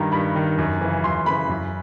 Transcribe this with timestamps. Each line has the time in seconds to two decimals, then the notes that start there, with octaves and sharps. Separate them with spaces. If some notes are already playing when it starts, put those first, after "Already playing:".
Already playing: G2 D#3 A#5
0.12 G2 B5
0.35 D#3
0.58 F#2
0.81 C#3 E3
1.04 F#2 C6
1.26 C#3 E3 B5
1.49 F#2